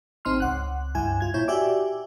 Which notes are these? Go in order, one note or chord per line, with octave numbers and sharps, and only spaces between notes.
G#1 C4 D#4 C6 F6
C#2 F#5 F#6
C#2 G2 E4 G#5
F4 G#6
A#2 E4 C#5 G6
F#4 G4 D5 E5 G#5 D6